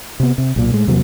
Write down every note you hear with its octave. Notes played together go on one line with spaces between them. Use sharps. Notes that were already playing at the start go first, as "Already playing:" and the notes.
C3 B3
C3
B1 A#2
A2 G#3
E2 C3 F#3 A#3